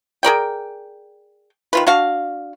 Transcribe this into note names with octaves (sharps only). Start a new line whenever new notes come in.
G#4 A#4 D5 G5
D#3 F4 B4
D4 F#4 F5